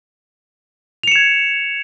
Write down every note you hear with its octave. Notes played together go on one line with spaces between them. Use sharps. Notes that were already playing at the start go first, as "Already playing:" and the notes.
G#6 C#7 E7 F7